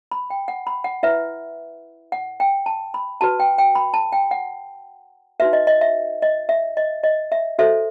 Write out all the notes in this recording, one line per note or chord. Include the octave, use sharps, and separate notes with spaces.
B5
G5
F#5
B5
F#5
E4 B4 E5
F#5
G5
A5
B5
F#4 B4 A5
G5
G5
B5
A5
G5
F#5
D#4 F#4 B4 E5
D#5
D#5
E5
D#5
E5
D#5
D#5
E5
F#4 A4 C5 E5